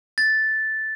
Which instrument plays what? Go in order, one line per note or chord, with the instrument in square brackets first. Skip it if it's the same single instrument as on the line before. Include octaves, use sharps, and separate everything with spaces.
[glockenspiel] A6